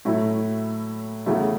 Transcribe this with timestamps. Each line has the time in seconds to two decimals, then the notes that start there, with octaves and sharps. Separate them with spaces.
0.05 A2 F#3 A3 E4
1.26 E2 C#3 F#3 A3 E4